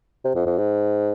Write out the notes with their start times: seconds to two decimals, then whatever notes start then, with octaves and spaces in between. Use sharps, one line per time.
0.24 C3
0.35 F2
0.46 F2
0.58 G#2